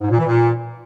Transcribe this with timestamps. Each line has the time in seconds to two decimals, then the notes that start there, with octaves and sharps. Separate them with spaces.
0.01 G#2
0.09 A#2
0.18 E3
0.26 A#2